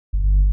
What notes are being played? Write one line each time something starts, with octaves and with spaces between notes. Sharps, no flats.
G1